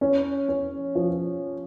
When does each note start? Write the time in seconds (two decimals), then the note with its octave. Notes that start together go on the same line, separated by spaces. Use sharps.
0.01 C#4
0.49 C#4
0.95 F3